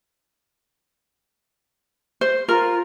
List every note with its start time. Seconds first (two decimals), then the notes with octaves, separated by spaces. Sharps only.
2.21 C5
2.49 F4 A#4